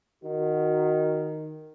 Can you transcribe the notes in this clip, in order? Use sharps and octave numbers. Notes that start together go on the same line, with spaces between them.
D#3 F#4